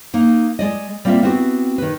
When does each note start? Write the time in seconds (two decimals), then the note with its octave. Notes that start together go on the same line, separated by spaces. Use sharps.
0.14 A#3 D#4
0.59 G#3 D5 D#5
1.05 G3 A#3 C4 F4 E5
1.23 B3 C4 E4 F#4 G4
1.78 D#3 B4